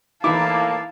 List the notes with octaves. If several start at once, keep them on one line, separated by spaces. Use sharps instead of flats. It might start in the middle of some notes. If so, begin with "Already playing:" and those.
A2 E3 A#3 D#4 E4 F5 A5 D6